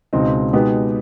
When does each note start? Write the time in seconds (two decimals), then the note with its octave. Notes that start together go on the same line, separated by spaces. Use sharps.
0.13 C#2 B2 G#3 C4 D#4
0.53 B2 G#3 B3 D#4 G4